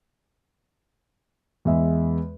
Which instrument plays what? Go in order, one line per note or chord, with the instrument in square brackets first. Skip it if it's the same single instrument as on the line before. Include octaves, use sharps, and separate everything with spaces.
[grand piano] E2 G#3 E5